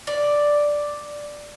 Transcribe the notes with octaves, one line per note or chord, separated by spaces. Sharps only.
D5